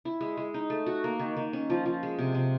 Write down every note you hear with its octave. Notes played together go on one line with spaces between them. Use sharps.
E4
G#3
G#3
D#4
A3
F#4
A#3
D#3
D#3
C#4
F3
F3
G#3
C3
C3